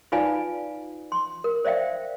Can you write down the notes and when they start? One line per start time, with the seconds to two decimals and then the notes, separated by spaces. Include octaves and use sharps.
0.12 D#4 F4 B4 D5 F5 G#5
1.12 C6
1.44 A#4
1.64 C5 D5 E5 F5 G5